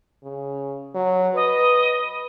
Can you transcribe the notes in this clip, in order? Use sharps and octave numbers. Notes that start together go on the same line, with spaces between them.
C#3
F#3
B4 D#5